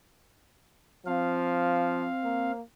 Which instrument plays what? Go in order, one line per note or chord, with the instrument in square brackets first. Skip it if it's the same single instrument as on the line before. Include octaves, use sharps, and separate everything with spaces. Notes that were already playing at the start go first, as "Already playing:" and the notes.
[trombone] F3 [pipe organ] C4 F5
[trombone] A#3